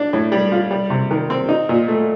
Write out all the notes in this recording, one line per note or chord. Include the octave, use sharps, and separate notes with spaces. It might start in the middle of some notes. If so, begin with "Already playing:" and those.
Already playing: D4
A2
G3
F4
G3
C3
D#3
C4
D#4
A#2
A3